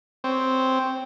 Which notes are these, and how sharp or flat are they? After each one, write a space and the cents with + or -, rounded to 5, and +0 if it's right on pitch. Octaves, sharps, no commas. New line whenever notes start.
C4 +0 C#5 +5